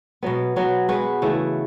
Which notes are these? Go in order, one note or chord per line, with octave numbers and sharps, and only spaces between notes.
B2 F#3 B3
B2 F#3 B3
G#3 B3 F#4 B4
C#3 E3 A3